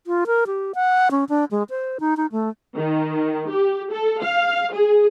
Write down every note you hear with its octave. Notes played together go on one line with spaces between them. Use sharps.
F4
A#4
G4
F#5
C#4
D4
G#3
C5
D#4
D#4
A3
D#3
G4
A4
F5
G#4